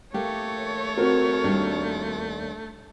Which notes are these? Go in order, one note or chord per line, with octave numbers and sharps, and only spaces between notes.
A3 A#3 G4 C#5
C4 F#4 A#4
D#2 G3 D4